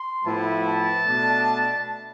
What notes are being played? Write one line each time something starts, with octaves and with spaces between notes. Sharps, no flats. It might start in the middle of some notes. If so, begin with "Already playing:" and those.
Already playing: C6
A2 F3 B3 E4 A5
A5
B2 A3 D4